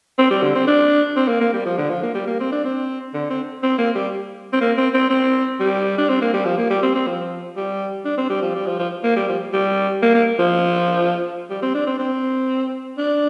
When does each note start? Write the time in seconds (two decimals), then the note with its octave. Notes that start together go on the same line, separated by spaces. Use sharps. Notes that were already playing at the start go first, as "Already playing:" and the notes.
0.19 C4
0.31 G3
0.42 D3
0.55 C4
0.67 D4
1.16 C4
1.28 A#3
1.41 A#3
1.53 G3
1.65 F3
1.78 D3
1.90 F3
2.03 A#3
2.15 G3
2.27 A#3
2.40 C4
2.52 D4
2.65 C4
3.14 D3
3.30 C4
3.63 C4
3.78 A#3
3.95 G3
4.53 C4
4.61 A#3
4.77 C4
4.94 C4
5.10 C4
5.60 G3
5.98 D4
6.09 C4
6.21 A#3
6.34 G3
6.45 F3
6.58 A#3
6.70 G3
6.83 C4
6.95 C4
7.07 F3
7.56 G3
8.05 D4
8.17 C4
8.30 G3
8.42 F3
8.55 G3
8.67 F3
8.79 F3
9.04 A#3
9.16 G3
9.29 F3
9.53 G3
10.02 A#3
10.14 A#3
10.39 F3
11.50 G3
11.62 C4
11.75 D4
11.87 C4
11.99 C4
12.98 D4